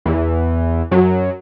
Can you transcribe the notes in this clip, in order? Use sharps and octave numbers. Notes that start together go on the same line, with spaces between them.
E2 E3
F#2 F#3